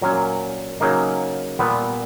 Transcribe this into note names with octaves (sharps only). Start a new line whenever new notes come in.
A#2 F#3 A#3 C#4
C#3 F#3 A#3 D#4
A#2 G3 B3